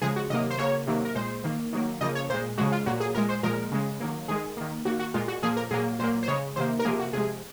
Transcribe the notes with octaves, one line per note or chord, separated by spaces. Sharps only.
C#3 F3 G#3 G#4
F#4
C3 D#3 F#3 A#3 D#5
C5
C#3 F#3 A#3 C#5
C3 D#3 F#3 A#3
A#4
A#2 G#3 C5
D#3 A#3
D#3 F#3 A#3
C#3 F3 A#3 D#5
C#5
A#2 G#3 C5
C#3 F3 G#3 F#4
F4
A#2 F#3 A#3 F#4
G#4
A#2 G#3 A#4
C5
A#2 F3 G#3 A#4
C#3 G#3
D#3 F#3 A#3
D#3 G#3 G#4
D#3 A#3
D#3 A#3 F#4
F#4
A#2 G#3 F4
F#4
A#2 F3 A#3 G#4
A#4
A#2 F#3 A#3 G#4
A#2 F#3 A#3 C5
C5
C#3 G#3 C#5
C3 D#3 A#3 C5
A#4
C3 F3 A#3 G#4
F#4
C3 F3 G#3 G#4